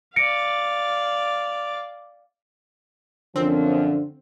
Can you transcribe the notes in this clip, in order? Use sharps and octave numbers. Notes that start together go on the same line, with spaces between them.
D5 F5 A#6 C#7 D7
F#2 D3 F3 C4